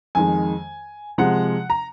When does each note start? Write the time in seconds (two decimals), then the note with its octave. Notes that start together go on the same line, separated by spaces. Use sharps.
0.15 F2 D#3 G#3 G#5
1.18 C3 F3 G#3 F#5
1.70 A#5